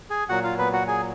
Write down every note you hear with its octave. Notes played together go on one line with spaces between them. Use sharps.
G#4 G#5
A#2 F#3 F#4 F#5
F4 F5
B3 B4
F#4 F#5
G#4 G#5